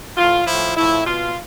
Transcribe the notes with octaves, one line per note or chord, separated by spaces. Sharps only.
A2 E3 F4
A2 F3 E4
A2 F3 E4
B2 F4